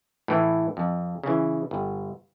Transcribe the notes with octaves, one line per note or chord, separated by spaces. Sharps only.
A2 E3
F2
C#3 E3
G1